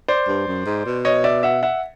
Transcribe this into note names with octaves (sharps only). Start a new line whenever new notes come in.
C5 D5
G2
F#2
G#2
B2
C#5 D#5
D5 E5
E5 F#5
E5 F#5